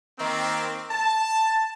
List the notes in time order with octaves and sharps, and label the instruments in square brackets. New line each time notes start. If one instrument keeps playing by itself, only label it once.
[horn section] D#3 A#3 C4
A5